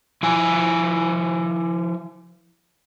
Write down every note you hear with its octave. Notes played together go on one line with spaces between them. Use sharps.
F3 E4 G#5